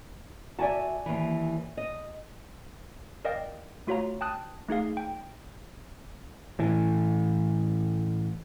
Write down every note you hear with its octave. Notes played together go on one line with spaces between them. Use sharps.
F#4 D5 E5 G#5 A5
D#2 E3
D#5
A#4 D5 D#5 F5 G5
A3 F4 F#4 C#5 F5 A#5
G5 A5 D#6 F#6
A3 D#4 G#4 F5
G5
A2 E3